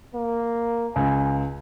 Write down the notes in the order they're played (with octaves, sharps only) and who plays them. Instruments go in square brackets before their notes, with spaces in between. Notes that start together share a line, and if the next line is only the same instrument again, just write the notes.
[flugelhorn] A#3
[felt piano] C#2 [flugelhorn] G#5